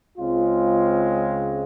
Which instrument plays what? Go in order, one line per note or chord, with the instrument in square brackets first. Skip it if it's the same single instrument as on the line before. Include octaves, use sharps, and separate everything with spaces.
[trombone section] C#2 C#3 G#3 C4 F4